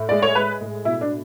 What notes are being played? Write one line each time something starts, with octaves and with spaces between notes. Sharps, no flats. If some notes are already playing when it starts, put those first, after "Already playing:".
Already playing: A2
G#3 D5
C#5
G#3 B4
A2
B2 E4
D4